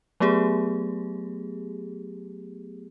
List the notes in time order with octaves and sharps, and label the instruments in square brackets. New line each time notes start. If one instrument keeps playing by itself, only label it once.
[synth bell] F#3 A3 B3 G4 G#4